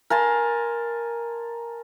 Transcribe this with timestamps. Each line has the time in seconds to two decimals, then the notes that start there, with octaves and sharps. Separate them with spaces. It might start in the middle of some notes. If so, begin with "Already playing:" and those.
0.10 A#4 G#5 A5 C6